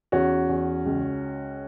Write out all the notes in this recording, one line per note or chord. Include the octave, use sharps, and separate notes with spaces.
E2 C#4 F#4
E2
C#2